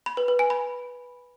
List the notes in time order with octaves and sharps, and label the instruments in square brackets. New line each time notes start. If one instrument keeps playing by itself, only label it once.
[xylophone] B5
B4
B4
G#5
B5